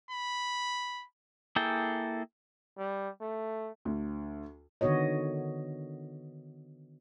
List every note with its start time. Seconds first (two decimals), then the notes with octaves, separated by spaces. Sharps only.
0.11 B5
1.56 A#3 E4 G#4 A4 G5
2.78 G3
3.21 A3
3.85 D2
4.81 D3 D#3 B3 F#4 C#5 D#5